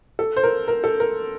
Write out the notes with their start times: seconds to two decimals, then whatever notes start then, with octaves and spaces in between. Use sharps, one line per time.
0.19 A4
0.36 C5
0.43 A#4
0.68 A#4
0.84 A4
1.00 A#4